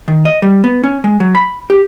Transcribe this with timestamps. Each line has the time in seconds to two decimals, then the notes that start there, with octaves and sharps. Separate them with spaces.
0.08 D#3
0.25 D#5
0.42 G3
0.64 B3
0.84 C#4
1.04 G#3
1.20 F#3
1.35 B5
1.70 G4